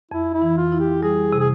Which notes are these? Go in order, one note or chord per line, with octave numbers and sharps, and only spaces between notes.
F2 E4
E4
E3
F4
E4
G4
G3 G#4
C3
G#4